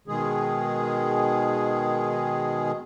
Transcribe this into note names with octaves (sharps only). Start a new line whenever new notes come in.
B2 D#3 G#3 G#4